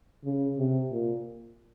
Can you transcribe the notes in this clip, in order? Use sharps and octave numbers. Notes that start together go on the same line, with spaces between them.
C#3
C3
A#2